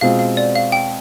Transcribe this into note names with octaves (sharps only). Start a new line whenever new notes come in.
B2 G#3 C4 F4 F5
F5
D5
F5
G5